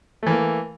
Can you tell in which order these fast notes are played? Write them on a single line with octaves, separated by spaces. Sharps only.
A3 E3 A#3